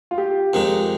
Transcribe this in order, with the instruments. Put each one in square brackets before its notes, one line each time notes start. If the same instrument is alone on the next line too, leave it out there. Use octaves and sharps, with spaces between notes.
[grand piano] F4
G4
[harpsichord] F2 D#3 G#3 D#4